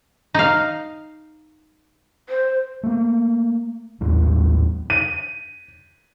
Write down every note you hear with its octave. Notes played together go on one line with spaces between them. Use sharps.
D#4 F5
C5
A3 A#3
A1 D#2 F#3 G#3
D#7